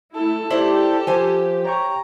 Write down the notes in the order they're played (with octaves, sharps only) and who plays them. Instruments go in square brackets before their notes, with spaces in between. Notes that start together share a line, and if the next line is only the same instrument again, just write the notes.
[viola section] A3 E4 [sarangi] A4
[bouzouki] D4 E4 C5 [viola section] G4
[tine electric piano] F3 [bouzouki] C5 G#5
[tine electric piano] C#5 G5 C#6 [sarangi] A#5